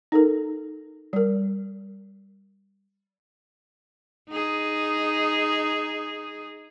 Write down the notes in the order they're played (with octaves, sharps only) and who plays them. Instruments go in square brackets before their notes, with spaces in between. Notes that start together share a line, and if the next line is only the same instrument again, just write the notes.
[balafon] D#4 A4 A#4
G3 A#4
[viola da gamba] D#4 G#4